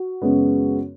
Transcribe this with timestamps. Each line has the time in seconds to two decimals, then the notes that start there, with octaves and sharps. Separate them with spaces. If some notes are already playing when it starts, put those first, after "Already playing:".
Already playing: F#4
0.22 F#2 C#3 G#3 B3